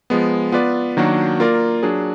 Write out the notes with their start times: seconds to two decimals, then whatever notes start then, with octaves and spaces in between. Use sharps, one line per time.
0.10 F3 G#3 B3
0.52 B3 F4 B4 D5
0.97 D#3 F#3 A#3 D4 F#4
1.40 A#3 F4 A#4 D5
1.83 F#3 D4 G#4